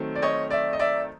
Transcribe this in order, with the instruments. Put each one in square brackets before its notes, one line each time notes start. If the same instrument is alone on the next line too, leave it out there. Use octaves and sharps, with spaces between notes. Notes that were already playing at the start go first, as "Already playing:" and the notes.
Already playing: [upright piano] D#3 F#3 A3 C4
D5
C#5 D#5
D5 E5
D#5
D5 E5